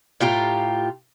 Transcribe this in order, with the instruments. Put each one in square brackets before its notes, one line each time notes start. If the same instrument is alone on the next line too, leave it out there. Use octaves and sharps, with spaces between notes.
[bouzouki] A2 F4 G4 A#5